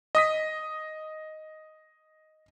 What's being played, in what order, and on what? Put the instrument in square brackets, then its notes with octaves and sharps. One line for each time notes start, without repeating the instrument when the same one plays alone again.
[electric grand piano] D#5 D#6 B6